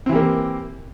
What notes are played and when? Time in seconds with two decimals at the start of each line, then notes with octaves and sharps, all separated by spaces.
0.06 C4
0.09 E3
0.12 G4
0.15 A#3